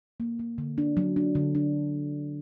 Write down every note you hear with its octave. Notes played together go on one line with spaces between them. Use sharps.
A#3
A#3
D3
D4
F#3
D4
D3
D4